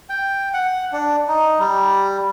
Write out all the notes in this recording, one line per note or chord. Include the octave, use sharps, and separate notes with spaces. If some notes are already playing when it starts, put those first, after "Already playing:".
G5
F#5
D4
D#4
G3